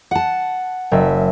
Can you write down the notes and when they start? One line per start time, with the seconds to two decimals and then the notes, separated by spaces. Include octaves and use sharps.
0.11 F#5 A5
0.91 F#1 E5